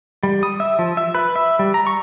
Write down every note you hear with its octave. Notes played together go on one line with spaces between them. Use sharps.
G3
D#6
E5
F3
E5
B4
E5
G3
A#5
C#6